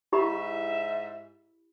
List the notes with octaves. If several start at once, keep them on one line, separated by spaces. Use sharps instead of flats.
G#2 E4 G4 E5 B5